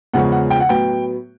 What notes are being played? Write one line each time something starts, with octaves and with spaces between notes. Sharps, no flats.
E2 C#3 F3 G#3 C#4 F#5
F#5
G5
F#5
A2 F#3 B3 G5